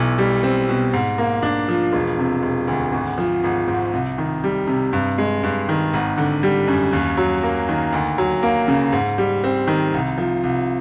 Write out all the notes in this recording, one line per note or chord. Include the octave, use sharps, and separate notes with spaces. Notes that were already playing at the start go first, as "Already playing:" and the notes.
Already playing: B1 E3
G3
C4
B2
G#2
A#3
D4
F3
E1
C3
E1
D2
G#1
F3
G#1
G#2
C2
D#3
G3
C3
G2
G#3
G2
D#3
G#1
D3
G3
F#2
D#2
F#3
A#3
D#3
D2
F#3
A#3
C#3
G#2
G3
C4
D#3
C2
F3
C2